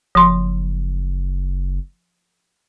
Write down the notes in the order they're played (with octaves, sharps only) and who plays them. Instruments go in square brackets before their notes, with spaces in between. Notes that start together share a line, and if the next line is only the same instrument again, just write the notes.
[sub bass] F#1 [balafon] F3 C6